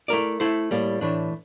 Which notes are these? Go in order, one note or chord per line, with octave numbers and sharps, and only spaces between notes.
A3 E4 A#4 D5
A3 E4 A4 C5
A2 G3 A#3
A2 E3 A3 D4